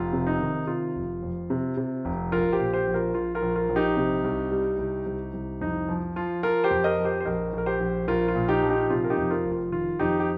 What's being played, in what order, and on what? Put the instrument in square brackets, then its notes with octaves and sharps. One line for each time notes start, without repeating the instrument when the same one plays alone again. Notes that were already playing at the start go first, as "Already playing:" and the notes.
Already playing: [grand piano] F1 F4
C3
D#4
D#3
C3 F4
F1
F2
C3
C3
F1
A#1 F4 A#4
G4 C5
A#2
G4 C5
A#1
F4 A#4
A#1 F4
F4 A#4
A#1
F4 A#4
A#1
D#4 G4
C3
C2
G3
C2
C2
C2
F2 D#4
F3
F3 F4
F3 F4 A#4
G4 C5
F2
A#4 D#5
F3
G4 C5
C5
A#1 A#4 D#5
A#1 A#4
G4 C5
A#1
A#1 F4 A#4
F4
A#2
D#4 G4
F3
D#4 G4
C3 F4
A#4
D#4 G4
F2
F4 A#4
F1
F4
D#3 F4
F2 D#4 G4
G4